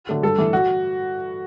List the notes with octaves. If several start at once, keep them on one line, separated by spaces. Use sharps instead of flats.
D3 F#3 A3
G2 A4
E3 A3
F#4